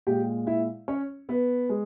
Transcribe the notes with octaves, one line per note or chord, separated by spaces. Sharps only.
A#2 G#3 G4 G5
E4 E5
C#4 C#5
B3 B4
G#3